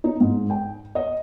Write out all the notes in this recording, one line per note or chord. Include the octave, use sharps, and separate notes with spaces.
D#4
G#2
G5
D#5